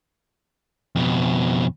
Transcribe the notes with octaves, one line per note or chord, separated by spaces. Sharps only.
F2 B2